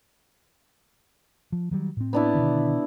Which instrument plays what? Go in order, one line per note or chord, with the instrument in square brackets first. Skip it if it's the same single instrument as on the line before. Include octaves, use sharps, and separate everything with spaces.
[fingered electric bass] F3
D#3 F#3 G3
A2 C4
[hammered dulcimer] B3 D4 E4
[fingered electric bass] B2 D3 D#3